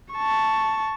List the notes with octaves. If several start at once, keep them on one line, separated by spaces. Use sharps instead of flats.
A5 C#6